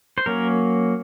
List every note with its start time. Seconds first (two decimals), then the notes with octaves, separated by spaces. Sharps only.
0.18 C5
0.26 F#3 A#3 C#4 A#4